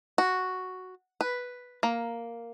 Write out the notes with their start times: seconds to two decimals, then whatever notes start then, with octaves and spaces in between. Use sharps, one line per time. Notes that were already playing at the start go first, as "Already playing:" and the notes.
0.18 F#4
1.21 B4
1.83 A#3